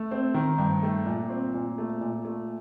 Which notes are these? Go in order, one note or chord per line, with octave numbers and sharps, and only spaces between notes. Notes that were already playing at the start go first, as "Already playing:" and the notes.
Already playing: A3
C4
D#3
G2
A3
A#2
C4
A#2
A3
A#2
A3